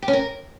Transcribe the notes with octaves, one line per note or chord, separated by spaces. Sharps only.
G4
C#4
A#4